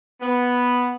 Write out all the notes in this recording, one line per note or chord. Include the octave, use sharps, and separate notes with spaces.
B3